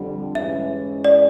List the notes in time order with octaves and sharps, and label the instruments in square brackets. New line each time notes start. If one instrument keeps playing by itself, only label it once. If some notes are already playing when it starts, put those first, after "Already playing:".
Already playing: [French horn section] F2 D3 G3
[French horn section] G#2 E3 G#3 C#4 E4 [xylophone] E5
[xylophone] D5